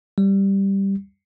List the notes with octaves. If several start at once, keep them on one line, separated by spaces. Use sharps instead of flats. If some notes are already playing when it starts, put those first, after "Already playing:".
G3